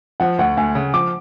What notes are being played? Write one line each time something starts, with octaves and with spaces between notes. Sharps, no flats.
F3 F#5
D2 F#5
D2 G#5
C#3
F3 D6